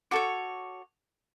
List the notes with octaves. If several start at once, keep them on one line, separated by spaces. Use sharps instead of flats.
F#4 A4 C#5 D6